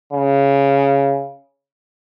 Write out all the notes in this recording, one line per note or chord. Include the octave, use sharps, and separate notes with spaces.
C#3